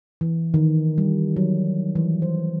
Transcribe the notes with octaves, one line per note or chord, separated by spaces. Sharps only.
E3
D#3
G3
F#3
E3
C5